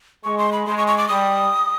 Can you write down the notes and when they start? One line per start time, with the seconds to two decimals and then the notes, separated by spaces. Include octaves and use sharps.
0.24 G#3 C#6
0.38 C6
0.53 B5
0.66 G#3 C6
0.77 C#6
0.88 C#6
0.98 D6
1.08 G3 D#6